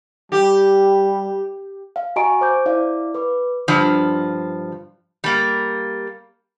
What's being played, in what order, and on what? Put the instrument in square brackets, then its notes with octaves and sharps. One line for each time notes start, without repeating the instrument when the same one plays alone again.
[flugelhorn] G3 [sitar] G4
[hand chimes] F5
F#4 D#5 G#5 A#5 C#6 D7
C5 D6 G6
E4 D5 F5 D6
B4 D6
[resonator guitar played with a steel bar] G2 F3
G3 A#3